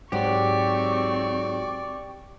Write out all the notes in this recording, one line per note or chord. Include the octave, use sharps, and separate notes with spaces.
G#2 F#3 C4 G4 D5 C#6